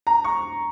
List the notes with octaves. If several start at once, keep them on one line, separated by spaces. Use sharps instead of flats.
A#5
C#6